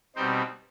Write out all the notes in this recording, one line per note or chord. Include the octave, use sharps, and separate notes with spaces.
B2 G3 C4 D#4 C5